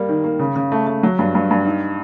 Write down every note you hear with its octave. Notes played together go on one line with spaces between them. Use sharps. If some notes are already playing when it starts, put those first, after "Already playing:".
Already playing: G3 A#3
D#3
A#3
C#3
C#3
A3
A3
F#3
G2
G2
G2
D#4